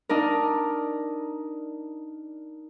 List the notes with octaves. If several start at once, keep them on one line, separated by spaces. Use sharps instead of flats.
D4 D#4 A#4